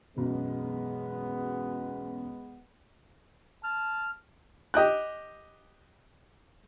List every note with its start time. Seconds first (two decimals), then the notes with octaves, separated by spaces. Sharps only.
0.16 E1 B1 F#2 G#3 B3
3.64 A5 F6
4.74 G4 D#5 G5 F#6